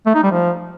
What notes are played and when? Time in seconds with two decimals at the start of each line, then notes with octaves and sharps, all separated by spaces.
0.06 A3
0.15 D#4
0.23 G3
0.32 F3